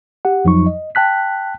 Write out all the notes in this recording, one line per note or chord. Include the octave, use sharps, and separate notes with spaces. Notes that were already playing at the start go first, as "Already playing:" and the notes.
G4 F#5
F2 F3 F#3 D#4 C#6
D#5
G5 A5 F#6 B6